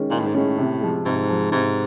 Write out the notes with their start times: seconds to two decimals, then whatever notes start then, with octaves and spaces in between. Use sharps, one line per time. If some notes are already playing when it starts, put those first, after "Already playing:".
Already playing: D#3 G#3 C#4
0.11 A#2 D#3
0.19 A2
0.26 G#2
0.35 A2 G#3 C#4
0.58 C3
0.81 F3 G#3
1.05 G#2 C3
1.29 F3 G#3
1.52 G#2 C3